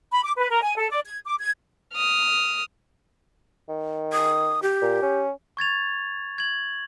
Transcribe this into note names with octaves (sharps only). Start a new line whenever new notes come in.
B5
D6
B4
A#4
G#5
A4
D5
G#6
D6
G#6
D#6 F6
D#3
D#6
G4
A#2
C#4
C#6 G#6 A6 F7
G#6 F#7